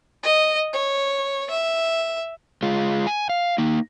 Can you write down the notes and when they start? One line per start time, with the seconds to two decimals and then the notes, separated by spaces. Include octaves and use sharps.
0.23 D#5
0.73 C#5
1.50 E5
2.63 G#3 F4
3.07 G#5
3.29 F5
3.58 A#3 D#4